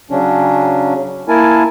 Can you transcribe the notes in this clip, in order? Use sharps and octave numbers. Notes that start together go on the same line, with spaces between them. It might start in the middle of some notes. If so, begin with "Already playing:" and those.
C#3 F#3 C#4 D4
A#3 E4 A#4 G#5 A5